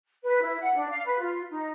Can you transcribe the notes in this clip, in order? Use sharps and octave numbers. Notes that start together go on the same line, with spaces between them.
B4
E4
F#5
D4
F5
B4
F4
D#4